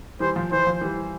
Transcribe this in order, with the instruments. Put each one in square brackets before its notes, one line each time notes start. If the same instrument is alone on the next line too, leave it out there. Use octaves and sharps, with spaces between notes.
[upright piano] E3 G3 [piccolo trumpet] C5
[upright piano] F3
[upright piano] E3 [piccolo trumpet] C5
[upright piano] F3
E3 G3